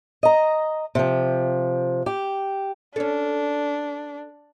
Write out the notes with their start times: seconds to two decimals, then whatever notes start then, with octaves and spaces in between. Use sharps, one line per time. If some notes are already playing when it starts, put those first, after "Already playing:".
0.23 D#5 A#5
0.95 C3 F3
2.06 G4
2.96 C#4 D4 A4